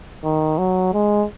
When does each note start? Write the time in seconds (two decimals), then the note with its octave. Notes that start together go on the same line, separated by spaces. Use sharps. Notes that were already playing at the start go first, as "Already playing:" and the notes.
0.24 D#3
0.58 F#3
0.93 G#3